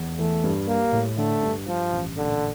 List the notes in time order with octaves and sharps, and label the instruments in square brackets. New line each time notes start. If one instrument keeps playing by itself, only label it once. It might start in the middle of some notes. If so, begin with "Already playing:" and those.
Already playing: [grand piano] E2
[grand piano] E3 [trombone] A3
[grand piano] G2
[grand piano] G3 [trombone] A#3
[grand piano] A2
[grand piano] D3 [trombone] A3
[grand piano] G2
[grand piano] G2 [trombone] F3
[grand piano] A1
[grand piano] A#2 [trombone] D3